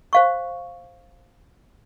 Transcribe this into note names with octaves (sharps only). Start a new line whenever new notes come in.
C5 F5 C#6